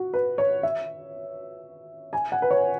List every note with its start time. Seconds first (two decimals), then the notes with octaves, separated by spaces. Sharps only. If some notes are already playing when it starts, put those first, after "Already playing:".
Already playing: F#4
0.13 B4
0.38 C#5
0.63 E5
2.13 G#5
2.32 F#5
2.42 B4
2.51 C#5